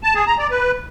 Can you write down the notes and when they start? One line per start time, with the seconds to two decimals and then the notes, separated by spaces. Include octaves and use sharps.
0.03 A5
0.15 G#4
0.27 A#5
0.39 D5
0.50 B4